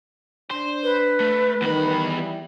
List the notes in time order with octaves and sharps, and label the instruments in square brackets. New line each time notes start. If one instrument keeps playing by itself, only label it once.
[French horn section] D4 [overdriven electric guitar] C5
[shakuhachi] B4
[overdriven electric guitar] A3
[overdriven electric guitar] E2 B5 [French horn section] D#3 G3
[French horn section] E3 G3